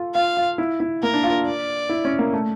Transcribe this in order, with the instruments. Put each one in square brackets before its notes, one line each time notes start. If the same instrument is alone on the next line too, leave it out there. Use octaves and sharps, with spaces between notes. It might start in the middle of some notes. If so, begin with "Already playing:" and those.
Already playing: [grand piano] F4 A4
[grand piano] F4 [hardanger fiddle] F5
[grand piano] F4
E4
E4
[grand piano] A#3 [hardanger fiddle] A#4
[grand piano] D4
F4
[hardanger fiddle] D5
[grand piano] E4
C#4
A#3
A3